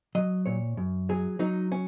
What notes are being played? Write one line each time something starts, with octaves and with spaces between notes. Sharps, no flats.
F#3 D#5
A#2 C#5
F#2
F#3 G#4
F#3 D#4
C#4